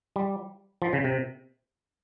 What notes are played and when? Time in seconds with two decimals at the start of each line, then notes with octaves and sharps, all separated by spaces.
0.16 G3
0.82 F3
0.93 C#3
1.04 C3